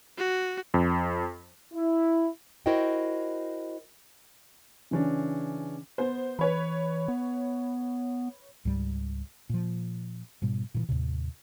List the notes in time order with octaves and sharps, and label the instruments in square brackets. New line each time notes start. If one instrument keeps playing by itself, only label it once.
[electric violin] F#4
[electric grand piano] F2
[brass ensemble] E4
[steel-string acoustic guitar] E4 F#4 A#4 C5 D#5 G5
[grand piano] C#3 E3 C#4 D4
[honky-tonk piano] B3 C5
[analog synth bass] E3 [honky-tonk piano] B4 C#5 B5
[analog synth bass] B3
[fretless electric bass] C#2 G#2 G3
A#2 F3
G#2 B2 G3
A#2 D#3 E3
D#2 A2 C3